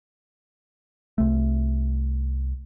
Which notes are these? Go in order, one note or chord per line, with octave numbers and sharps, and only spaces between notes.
C2 A3